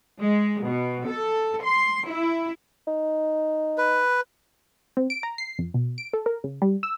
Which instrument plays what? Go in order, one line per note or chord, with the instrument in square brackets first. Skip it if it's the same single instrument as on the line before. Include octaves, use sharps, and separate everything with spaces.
[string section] G#3
B2
A4
C6
E4
[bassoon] D#4
[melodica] B4
[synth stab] C4
D7
A#5
C7
F2
B2
D7
A4
A#4
C#3
G3
E6